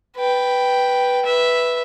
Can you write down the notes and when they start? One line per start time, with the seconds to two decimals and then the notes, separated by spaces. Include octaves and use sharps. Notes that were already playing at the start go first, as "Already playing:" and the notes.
0.16 B4 G5
1.26 B4 E5